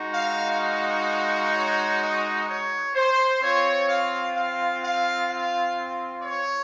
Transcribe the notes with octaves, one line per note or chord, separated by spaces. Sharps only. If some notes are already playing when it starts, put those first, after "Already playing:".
Already playing: G#3 D#4 F#4
F5
F5
C#5
D#5
C#5
C5
C4 F4 C#5
F5
F5
F5
F5
C#5